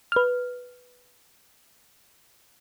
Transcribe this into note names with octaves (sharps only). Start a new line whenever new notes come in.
B4 F6